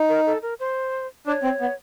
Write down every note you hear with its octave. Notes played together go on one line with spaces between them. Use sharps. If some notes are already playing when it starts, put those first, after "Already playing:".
Already playing: D#4
A#4
A4
A#4
C5
D4 C#5
C4
B3